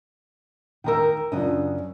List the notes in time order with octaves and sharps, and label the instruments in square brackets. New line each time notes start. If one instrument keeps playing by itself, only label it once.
[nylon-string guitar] D#3 D#4 A#4 [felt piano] G5 A#5 E6
[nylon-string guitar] F#2 C#3 D#5 [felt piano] C#4 D4 F4